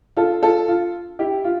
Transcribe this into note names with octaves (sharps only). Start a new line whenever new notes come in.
F4 A4
F4 A4
F4
E4 G4
F4